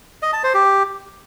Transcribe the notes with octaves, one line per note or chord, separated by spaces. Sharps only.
D#5
A5
C5
G4